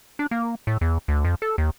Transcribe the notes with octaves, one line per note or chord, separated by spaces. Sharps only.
D4
A#3
A2
E2
D2
F2
A4
D#2